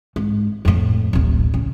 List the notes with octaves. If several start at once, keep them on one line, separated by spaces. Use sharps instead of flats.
G#2
F2 A2
D1 A1
C#3